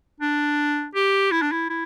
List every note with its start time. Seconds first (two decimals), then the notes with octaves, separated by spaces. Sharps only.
0.20 D4
0.95 G4
1.32 E4
1.42 D4
1.52 E4
1.69 E4